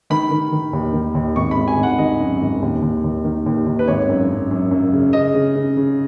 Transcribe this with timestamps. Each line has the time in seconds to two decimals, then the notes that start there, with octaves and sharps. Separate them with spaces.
0.10 D#3 B5
0.31 D#3
0.52 D#3
0.73 D#2
0.93 D#3
1.15 D#2
1.36 G#1 C#6
1.51 B5
1.56 G#1
1.68 G#5
1.78 G#1 F#5
1.98 D#3 D#5
2.20 F#2
2.41 G#1
2.62 D#2
2.82 D#2
3.04 D#2
3.24 D#3
3.46 D#2
3.66 D#2
3.79 B4
3.88 G#1 C#5
4.09 F#2
4.30 F#2
4.51 F#2
4.71 F#2
4.93 C#3
5.13 C#3 D#5
5.35 C#3
5.55 C#3
5.77 C#3